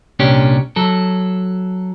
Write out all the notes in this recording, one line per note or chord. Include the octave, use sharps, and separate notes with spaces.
C2 A#2 C#4 D4 G4
F#3 A4